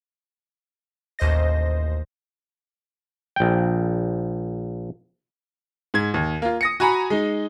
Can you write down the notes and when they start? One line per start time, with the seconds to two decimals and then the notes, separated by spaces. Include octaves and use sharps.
1.19 A1 D#2 C5 D#5 A#6
3.36 A#1 G5
5.94 G#2 G#6
6.14 D#2
6.42 A#3 F4
6.61 D#6 A#6 C#7
6.80 F#4 G#5 A#5 B5
7.10 G#3 D#4